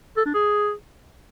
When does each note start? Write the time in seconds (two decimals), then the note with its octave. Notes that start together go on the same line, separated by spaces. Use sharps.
0.17 A4
0.26 D4
0.34 G#4